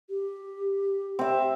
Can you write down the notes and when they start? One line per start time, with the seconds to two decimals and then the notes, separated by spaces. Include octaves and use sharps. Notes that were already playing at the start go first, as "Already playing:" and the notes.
0.09 G4
1.19 C4 E5